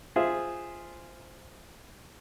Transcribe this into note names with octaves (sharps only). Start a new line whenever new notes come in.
F4 G#4 C5 E5